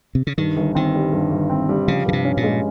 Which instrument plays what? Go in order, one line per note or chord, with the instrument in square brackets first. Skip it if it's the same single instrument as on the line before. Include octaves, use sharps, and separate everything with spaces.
[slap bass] C3
C#3
[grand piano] G2 [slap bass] D#3
[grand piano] G1
[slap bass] D#3 [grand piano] C4
[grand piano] G3
G2
G1
C4
G3
[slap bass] C#3 [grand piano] F3
[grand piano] G2 [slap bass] C#3
[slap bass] C3
[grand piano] C#4
[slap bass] A#2
[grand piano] G#3